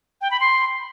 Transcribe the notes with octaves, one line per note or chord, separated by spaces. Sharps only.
G5
B5
C6